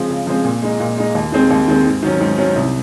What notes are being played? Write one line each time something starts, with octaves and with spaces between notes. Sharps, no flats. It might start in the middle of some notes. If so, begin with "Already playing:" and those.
Already playing: C#3 F3 G#3 C4
C#3
F3 G#3 C4
A#2
G#3 D#4
A#2
G#3 D#4
D#2
D#3 G#3 C4
D#2
D#3 G#3 C4
G#2
D#3 F#3 C#4
G#2
D#3 F#3 C#4
C2